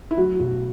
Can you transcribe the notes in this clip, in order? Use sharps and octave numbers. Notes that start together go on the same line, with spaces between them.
E4
F#3 F#4
B1 F#4